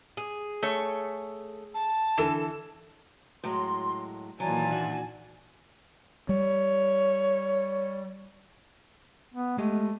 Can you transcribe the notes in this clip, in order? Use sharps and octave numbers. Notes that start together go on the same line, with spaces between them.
G#4
A3 C#5
A5
D3 E3 A4 E7
A2 F#3 G#3 C6
A#2 D#3 E3 F#3 F4 D5 G#5 A5
D4 F#4
G3 C#5
B3
G#3 A3 G4 D#5